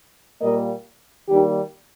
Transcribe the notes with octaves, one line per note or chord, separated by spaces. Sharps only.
A#2 G3 A#3 A#4 D#5
D#3 G3 A#3 D#4 G4